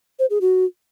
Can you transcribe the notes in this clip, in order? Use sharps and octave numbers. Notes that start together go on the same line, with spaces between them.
C5
G#4
F#4